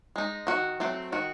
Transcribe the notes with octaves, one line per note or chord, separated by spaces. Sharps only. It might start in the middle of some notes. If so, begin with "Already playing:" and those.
G#3 D#4
D#3 F#4
F#3 A3 C4
D#3 F#4